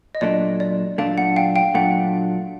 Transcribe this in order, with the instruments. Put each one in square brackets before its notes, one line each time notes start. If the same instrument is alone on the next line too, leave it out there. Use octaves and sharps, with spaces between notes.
[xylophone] D#5
[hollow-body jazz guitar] A#2 F#3 A3 D4 [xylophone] D5
[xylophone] D5
[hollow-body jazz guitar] A#2 F#3 A3 D4 [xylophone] F5
[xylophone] F#5
F5 G5
F5 G5
[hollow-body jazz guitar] A#2 F#3 A3 D4 [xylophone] F#5